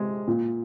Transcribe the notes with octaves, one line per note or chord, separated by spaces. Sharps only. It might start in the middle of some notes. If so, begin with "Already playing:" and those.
Already playing: C3 G#3
A#2